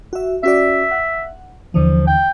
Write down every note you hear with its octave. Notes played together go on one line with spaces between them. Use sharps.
F#4 E5
C#4 F#4 D5 E5
F#5
D#2 D3 E3 F3
G5